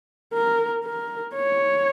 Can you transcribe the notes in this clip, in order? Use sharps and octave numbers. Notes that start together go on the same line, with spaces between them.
A#4
A#4
C#5